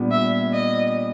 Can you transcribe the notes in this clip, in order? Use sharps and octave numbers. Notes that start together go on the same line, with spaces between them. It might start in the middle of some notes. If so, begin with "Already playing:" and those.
Already playing: A#2 G3 B3 D4
E5
D#5